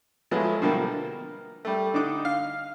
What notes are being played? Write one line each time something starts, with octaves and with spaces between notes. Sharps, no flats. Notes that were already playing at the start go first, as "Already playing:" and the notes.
F3 F#3 G#3 A3 B3 E4
B2 D3 F3 G3 A#3
A#4
G3 A3
D3 D4 D#4 D6 D#6
F5